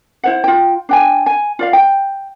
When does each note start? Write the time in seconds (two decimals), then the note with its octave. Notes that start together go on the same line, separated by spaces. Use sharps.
0.24 E4 C5 F#5
0.44 F4 G5
0.89 D4 G5 G#5
1.26 G#5
1.59 F4 D5 F5
1.73 G5